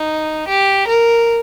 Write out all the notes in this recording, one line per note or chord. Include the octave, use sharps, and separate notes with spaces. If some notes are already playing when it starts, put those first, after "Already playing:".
Already playing: D#4
G4
A#4